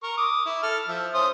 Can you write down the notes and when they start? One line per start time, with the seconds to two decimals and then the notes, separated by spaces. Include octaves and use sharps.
0.03 A#4 C#6
0.17 D6 D#6
0.46 E4
0.63 A4 F6
0.88 F3 E5
1.14 C#4 C5 D#6